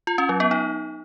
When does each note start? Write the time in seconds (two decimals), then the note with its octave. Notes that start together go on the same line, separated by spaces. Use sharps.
0.07 F4
0.18 C#4
0.29 F#3
0.40 B3
0.51 D#4